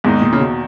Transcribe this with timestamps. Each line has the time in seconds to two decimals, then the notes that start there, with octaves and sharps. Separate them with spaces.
0.04 E2 G#2 D#3 A#3 D#4
0.22 A#2
0.33 C#3
0.40 B2